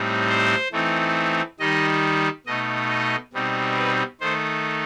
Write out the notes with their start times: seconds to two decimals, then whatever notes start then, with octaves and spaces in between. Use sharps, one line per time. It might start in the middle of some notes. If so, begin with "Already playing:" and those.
Already playing: A2 G3 C4 D#4
0.29 C5
0.72 E3 A3 C4 D#4
1.59 D#3 G3 D#4 D#5
2.46 B2 A3 D#4 D#5
2.90 D#5
3.33 B2 G3 C4 D#4
3.77 B4
4.20 D#3 A3 D#4 C5